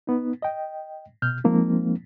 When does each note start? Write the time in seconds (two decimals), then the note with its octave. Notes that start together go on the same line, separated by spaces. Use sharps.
0.07 B3 D#4
0.42 D#5 G5
1.22 B2 F6 G6
1.44 F3 G#3 A#3 C4 D#4